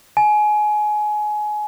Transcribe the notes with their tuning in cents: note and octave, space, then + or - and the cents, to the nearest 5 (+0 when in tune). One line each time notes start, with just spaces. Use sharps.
G#5 +25